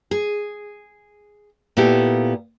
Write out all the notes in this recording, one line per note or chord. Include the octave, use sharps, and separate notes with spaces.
G#4
A#2 B3 E4 G4 A4